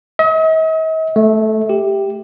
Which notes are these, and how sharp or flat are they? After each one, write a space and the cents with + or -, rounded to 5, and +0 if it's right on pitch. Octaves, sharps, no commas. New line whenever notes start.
D#5 +45
A3 -10
G4 +10